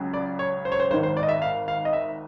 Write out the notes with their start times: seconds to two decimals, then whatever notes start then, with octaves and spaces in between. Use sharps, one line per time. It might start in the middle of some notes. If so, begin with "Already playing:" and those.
Already playing: C#2 C#3 F#3
0.14 D5
0.39 C#5
0.65 C5
0.72 C#5
0.80 C5
0.90 G#1 G#2 D#3 C5
1.03 C5
1.17 D5
1.23 D#5
1.29 E5
1.42 F5
1.68 F5
1.85 D#5
1.93 E5